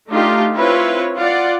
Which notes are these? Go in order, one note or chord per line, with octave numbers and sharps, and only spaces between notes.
A3 D4 D#4 F4 G4
C4 E4 F4 B4 C#5
F4 D5 F#5